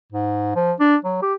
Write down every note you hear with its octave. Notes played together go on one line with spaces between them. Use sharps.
G#2
F3
D4
F#3
G4